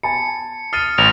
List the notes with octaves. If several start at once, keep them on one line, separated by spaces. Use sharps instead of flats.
G#5 A5 B5 C#7
D#6 F6 A6 C7 D#7
A1 F7